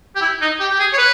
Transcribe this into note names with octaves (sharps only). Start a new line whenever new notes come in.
G4
E4
D#4
G4
G4
G#4
C#5
B4